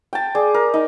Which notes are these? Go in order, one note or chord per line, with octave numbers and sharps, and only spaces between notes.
G5 A5
G#4 D5
A#4
D#4